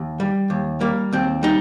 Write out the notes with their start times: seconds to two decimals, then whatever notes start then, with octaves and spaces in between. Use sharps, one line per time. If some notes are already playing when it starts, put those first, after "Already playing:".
Already playing: D#2
0.20 G3
0.50 D#2
0.81 G3 A#3
1.12 D#2 C4
1.43 G3 D#4